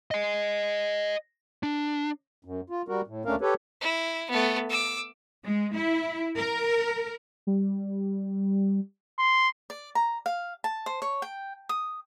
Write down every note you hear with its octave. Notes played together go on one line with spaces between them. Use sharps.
D#5 G#5
D4
F#2
F4
G3 F#4 A#4
A2
D2 A3 C#4 D4 A#4 F5
G4 A4 B4 C#5
E4
A3 B3
D6 E6
G#3
E4
A#4
G3
C6
D5
A#5
F5
A5
C5
C#5
G5
D#6